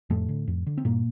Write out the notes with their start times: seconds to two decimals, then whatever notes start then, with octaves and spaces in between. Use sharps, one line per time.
0.10 F2 A2 A3
0.29 D3
0.48 F2
0.67 D3
0.78 C4
0.85 G2 A#2 A#3